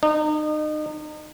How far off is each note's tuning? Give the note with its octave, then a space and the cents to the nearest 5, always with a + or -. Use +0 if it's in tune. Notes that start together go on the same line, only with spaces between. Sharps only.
D#4 -35